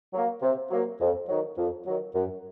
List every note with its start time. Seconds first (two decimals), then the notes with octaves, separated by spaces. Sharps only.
0.14 F#3 A#3
0.42 C3
0.70 F#3 A#3
1.00 F2
1.29 D#3 F#3
1.58 F2
1.86 D#3 F#3
2.15 F#2